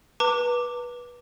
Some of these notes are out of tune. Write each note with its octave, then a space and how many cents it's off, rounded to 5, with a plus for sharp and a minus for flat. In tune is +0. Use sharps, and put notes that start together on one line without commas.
B4 -20 A#5 -45 D6 +0